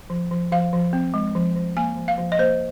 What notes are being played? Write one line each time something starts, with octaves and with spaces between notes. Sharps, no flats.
F3
F3
F3 F5
F3
C4
G#3
F3
F3
A#3 G#5
F3
F5
F3
D#5
A#3 C5